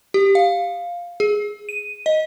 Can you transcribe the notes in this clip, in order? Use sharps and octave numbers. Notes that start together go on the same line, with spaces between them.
G4
F5
G#4
D#7
D#5